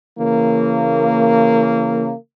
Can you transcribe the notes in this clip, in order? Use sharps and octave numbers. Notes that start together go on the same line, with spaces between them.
C#3 E3 A#3